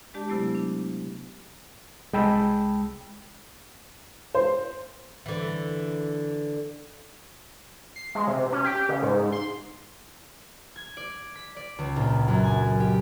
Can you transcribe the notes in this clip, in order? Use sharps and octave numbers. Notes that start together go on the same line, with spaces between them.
G#3 D4 G4 D5 A5
C3 F#3 A3 B3 E4
D4
C2 G#3 G5 A5 B5 E6
C5
D3 E3
C7
G#3
C3
C#4
G4
C#3
G#2
C6
G#6
D5
B6
D5
C#2
A#1
F#2
G#5
G4